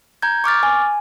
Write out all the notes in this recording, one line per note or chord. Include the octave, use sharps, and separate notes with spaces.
A#5 G6 G#6
C#6 D6 F6 A6
G#5